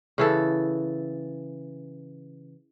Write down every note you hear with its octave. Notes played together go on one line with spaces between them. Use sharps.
C#3 E3 A4